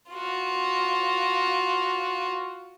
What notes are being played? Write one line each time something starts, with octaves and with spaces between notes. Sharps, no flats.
F4 F#4